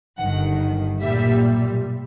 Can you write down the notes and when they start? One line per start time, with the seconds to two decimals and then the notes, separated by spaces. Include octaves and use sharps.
0.19 G1 G2 D#3 F#5
1.00 B1 A#2 G3 E5